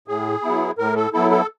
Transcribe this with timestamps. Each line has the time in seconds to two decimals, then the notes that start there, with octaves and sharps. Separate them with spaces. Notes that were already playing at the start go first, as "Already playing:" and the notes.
0.08 A2 G#4
0.43 F#3 B3 E4
0.78 A2 A#4
0.96 A4
1.13 F#3 B3 E4 A4
1.31 A4